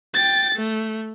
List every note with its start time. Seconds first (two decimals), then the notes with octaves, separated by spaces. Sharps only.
0.14 G5 A6
0.55 A3